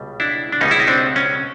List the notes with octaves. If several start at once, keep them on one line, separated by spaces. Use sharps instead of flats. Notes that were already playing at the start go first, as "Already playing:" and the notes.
Already playing: C#2 B2 G3
D4 E4
D4
C#2 B2 G3 C#4 D#4
E4
D#4
C4 D4
C#4